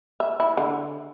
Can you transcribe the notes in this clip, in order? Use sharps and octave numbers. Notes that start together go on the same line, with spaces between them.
E5
E4
D3